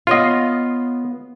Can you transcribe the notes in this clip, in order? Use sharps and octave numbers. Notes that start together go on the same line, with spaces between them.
B3 F4 C#5 D#5 F5